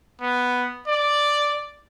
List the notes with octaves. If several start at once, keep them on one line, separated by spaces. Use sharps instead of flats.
B3
D5